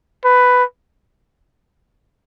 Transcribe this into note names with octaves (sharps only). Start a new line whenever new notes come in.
B4